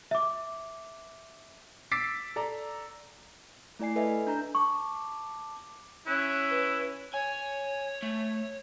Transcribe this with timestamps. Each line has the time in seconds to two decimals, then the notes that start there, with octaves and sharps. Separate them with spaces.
0.11 E5 D6
1.91 D6 E6 A6 B6 C7 D7
2.36 A4 D5 A#5
3.79 A3 E4 D5 G#5 C7
3.96 A4 B4 D#5 E5 G#5
4.27 D4 A#5 G6
4.55 A5 C#6 D6
6.06 C#4 E4 F#6
6.50 B4
7.14 C#5 G#5
8.02 A3